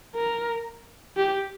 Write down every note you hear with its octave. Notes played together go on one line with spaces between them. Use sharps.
A#4
G4